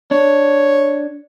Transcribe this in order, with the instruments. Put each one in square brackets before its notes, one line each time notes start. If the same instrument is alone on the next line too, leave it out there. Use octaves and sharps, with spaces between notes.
[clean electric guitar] D4 [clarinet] C#5